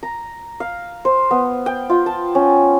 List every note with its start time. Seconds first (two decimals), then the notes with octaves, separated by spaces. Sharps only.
0.03 A#5
0.60 F5
1.05 C5
1.31 B3
1.66 G5
1.90 F4
2.06 A5
2.35 C#4